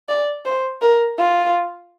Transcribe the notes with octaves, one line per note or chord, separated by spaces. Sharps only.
D5
C5
A#4
F4